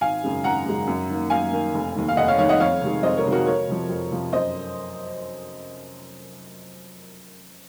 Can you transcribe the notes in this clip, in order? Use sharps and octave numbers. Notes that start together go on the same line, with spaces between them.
G#1 F5 G#5
F#2 C#3 G#3
G#1 F#5 A#5
F#2 C#3 G#3
F#2
D#3 A#3
F#2 F5 G#5
D#3 A#3
F1
D#2 D#3
F5
F1 D#5 F#5
C#5 F5
D#2 D#3 C#5 F5
D#5 F#5
F2 C#5 F5
C3 D#3 G#3
F2 C5 D#5
A#4 C#5
C3 D#3 G#3
F#4 A#4
F2 A#4 C#5
C3 F3
F2
C3 F3
F#2 C5 D#5